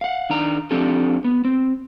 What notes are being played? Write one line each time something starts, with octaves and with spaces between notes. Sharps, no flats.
F5 F#5
D#3 D4 A#5
F3 C4 D4 G4 A4
B3
C4